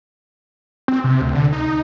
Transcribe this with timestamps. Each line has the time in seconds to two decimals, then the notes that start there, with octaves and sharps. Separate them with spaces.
0.88 C4
1.04 C3
1.21 D2
1.35 D3
1.53 D#4